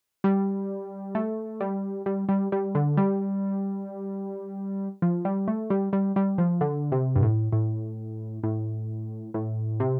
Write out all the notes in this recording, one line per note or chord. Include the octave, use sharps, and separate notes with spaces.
G3
A3
G3
G3
G3
G3
D3
G3
F3
G3
A3
G3
G3
G3
F3
D3
C3
G2
A2
A2
A2
A2
C3